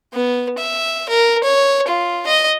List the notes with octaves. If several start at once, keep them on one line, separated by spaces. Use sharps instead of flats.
B3
E5
A#4
C#5
F4
D#5